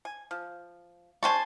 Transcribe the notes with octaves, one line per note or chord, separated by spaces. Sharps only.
G#5
F3
G3 D4 C5 G#5 A5 C#6